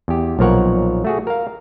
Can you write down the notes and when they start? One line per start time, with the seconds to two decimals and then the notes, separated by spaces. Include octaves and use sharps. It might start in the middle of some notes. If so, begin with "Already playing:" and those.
0.08 E2 G4
0.39 B1 A#2 F3 A#4 C#5 F#5
1.05 A3 F#4 G#4
1.27 A#4 F5